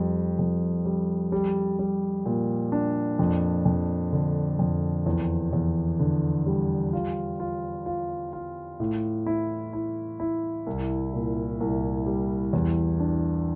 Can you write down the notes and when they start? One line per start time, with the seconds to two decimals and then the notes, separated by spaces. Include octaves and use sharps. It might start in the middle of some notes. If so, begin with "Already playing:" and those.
Already playing: F2 G3
0.39 F2
0.85 G3
1.32 G3
1.79 G3
2.26 A#2
2.72 D4
3.19 F2
3.65 F2
4.13 D3
4.59 F2
5.06 E2
5.53 E2
6.00 D3
6.46 G3
6.93 F4
7.40 F4
7.86 F4
8.33 F4
8.80 A2
9.26 E4
9.73 E4
10.20 E4
10.67 C2
11.13 A#2
11.60 C2
12.06 G3
12.53 E2
13.00 D4